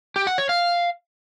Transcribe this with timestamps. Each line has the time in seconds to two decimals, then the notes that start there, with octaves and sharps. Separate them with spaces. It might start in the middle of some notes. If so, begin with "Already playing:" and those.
0.16 G4
0.27 F#5
0.38 C#5
0.49 F5